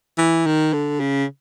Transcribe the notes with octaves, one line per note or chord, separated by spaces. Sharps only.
E3
D#3
D3
C#3